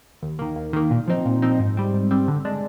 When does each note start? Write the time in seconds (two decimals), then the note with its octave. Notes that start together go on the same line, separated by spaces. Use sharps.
0.22 D#2
0.39 D#3 A#3
0.56 D#2
0.73 D#3 A#3
0.91 A#2
1.07 F3 C4 D#4
1.26 A#2
1.42 F3 C4 D#4
1.60 G#2
1.77 G3 C4
1.94 G#2
2.11 G3 C4
2.28 D3
2.45 G#3 D4